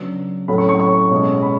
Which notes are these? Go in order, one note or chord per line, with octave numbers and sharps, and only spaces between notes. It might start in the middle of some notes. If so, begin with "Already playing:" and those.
Already playing: C#3 F#3 B3 D4
A2 F#3 A3 C#4 B5
C#6
C#6
C#6
B2 G#3 C#4
B5